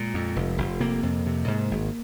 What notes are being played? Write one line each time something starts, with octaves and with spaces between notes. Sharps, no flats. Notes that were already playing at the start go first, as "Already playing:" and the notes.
Already playing: A#2 G#3
F2
F1
F1
C3 A#3
F2
C3
G#2
G#1